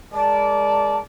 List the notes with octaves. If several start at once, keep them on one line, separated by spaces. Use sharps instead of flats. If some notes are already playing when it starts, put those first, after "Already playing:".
G#3 A#4 D5 A5